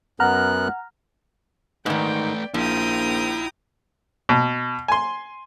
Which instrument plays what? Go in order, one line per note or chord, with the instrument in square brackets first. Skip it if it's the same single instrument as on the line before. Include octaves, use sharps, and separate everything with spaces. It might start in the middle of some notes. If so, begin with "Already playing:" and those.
[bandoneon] F#2 B3 F#6 [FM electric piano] F#5 A#5 F6
[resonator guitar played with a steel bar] G#2 D#3 [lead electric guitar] A3 B4 [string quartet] D5 G5
[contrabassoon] A#1 [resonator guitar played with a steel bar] F3 [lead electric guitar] E4 F4 [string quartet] G5 A#5 D#6
[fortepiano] B2
G#5 C6